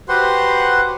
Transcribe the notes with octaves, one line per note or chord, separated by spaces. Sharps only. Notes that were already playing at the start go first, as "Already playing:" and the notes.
F#4 G4 B4 C5 F#5 C6